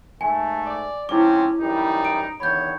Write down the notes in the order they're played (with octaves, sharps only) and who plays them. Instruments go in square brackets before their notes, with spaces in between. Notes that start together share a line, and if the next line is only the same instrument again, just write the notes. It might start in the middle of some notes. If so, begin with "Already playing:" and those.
[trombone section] G#2 A3 [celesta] G#5
[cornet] D5
[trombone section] G#2 F3 C4 [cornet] C#4 [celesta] E4 D6
[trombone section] F#2 E3 G3 [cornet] D#4
[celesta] D7
[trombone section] E2 D3 D#3 [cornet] C#5 [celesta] B5 G6